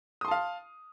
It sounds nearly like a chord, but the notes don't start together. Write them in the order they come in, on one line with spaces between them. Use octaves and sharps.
D#6 C6 A5 F5